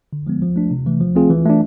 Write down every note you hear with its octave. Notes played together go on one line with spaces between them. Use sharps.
D3
F3 G#3 B3
F3
A3 D4
C3
E3 A3
F3
A3 C4 F4 G#4
E3
A3 D4